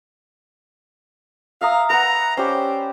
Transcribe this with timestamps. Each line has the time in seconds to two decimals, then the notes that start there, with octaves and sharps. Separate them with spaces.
1.61 E5 F5 A#5 D#6
1.90 B4 F#5 A#5
2.37 C#4 G4 C5 D5